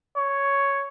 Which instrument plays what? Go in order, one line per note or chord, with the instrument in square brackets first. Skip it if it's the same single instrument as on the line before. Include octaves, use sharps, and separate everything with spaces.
[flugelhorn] C#5